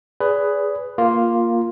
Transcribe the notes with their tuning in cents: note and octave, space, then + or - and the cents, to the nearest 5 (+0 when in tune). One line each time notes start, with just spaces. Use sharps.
G#4 +0 B4 +10 D5 -30
A#3 +0 F4 +0